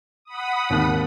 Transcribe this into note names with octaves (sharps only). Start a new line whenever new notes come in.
F#5 B5 D#6
G#1 D#2